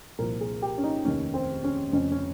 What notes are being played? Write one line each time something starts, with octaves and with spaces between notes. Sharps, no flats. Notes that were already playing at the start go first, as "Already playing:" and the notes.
C2 A#2 F3 A#4
G#4
G4
C#4
D#4
F1 D#2 D#3 C#4
C4
C#4
F1 F2 C#3 C#4
C#4